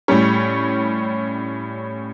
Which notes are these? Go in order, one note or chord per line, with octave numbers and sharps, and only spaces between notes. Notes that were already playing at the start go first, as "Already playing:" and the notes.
A2 G3 C#4